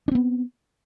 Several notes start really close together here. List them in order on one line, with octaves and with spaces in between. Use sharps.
D4 C4 B3